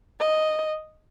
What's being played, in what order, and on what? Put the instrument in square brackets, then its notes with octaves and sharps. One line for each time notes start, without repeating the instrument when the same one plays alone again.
[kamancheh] D#5